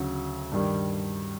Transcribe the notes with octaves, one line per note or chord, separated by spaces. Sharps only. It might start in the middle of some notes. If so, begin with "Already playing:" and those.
Already playing: D2 C#3 F#3
G2 D#3 G3